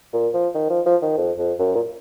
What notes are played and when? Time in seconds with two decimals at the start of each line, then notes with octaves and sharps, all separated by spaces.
0.13 A#2
0.34 F3
0.55 D#3
0.70 F3
0.86 F3
1.02 D#3
1.17 F2
1.38 F2
1.59 F#2
1.75 A#2